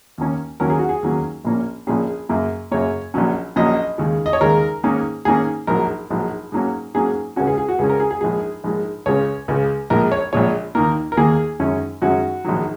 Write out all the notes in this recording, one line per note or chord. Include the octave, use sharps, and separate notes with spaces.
D#2 D#3 A#3 C#4
D#2 D#3 F#3 A#3 C#4 A#4
G#4
F#4
G#4
D#2 D#3 F#3 A#3 C#4
A#1 A#2 A#3 C#4
A#1 A#2 A#3 C#4 G#4
F#2 C#3 A#3
F#2 C#3 A#3 C#5
A#1 A#2 F#3 C#4
A#1 A#2 F#3 C#4 D#5
D#2 C#3 G#3
D#5
C#5
D#2 C#3 G#3 A#4
G#2 D#3 A#3 C#4
G#2 D#3 A#3 C#4 G#4
A#1 G#2 F#3 A#4
A#1 G#2 F#3
G#2 F#3 A#3 C#4
G#2 F#3 A#3 C#4 G#4
C#2 C#3 G#3 C#4 F#4
G#4
G#4
F#4
C#2 C#3 G#3 C#4 G#4
A#4
G#4
G#4
A#1 G#2 G#3 G#4
A#1 G#2 G#3
C#2 C#3 G#3 C#4 C#5
C#2 C#3 G#3 C#4
A#1 A#2 G#3 A#4
C#5
A#1 A#2 G#3 C#5
D#2 D#3 A#3 A#4
A#4
D#2 D#3 A#3 G#4
F#2 D#3 G#3 C#4
F#2 D#3 G#3 C#4 F#4
A#1 G#2 D#3 F#3